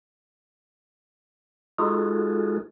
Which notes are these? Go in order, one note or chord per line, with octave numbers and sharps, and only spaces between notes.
G#3 D#4 F4 F#4 G#4 A4